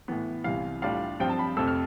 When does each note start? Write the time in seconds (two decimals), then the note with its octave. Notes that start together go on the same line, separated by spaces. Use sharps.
0.08 A2 E3 B3
0.44 C2 C3 E3 F5
0.82 A2 G3 D4 F4 F5
1.20 G2 F3 C4 F4 G5
1.30 A5
1.39 B5
1.57 F2 C3 F3 A3 E6
1.68 F6